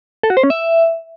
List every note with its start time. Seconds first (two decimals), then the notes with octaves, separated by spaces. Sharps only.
0.23 A4
0.30 F#4
0.37 C5
0.43 C#4
0.50 E5